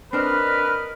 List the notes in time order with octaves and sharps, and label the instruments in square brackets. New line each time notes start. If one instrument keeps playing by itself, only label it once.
[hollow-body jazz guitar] C4 D4 [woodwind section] A#4 D#5 F6 [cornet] B4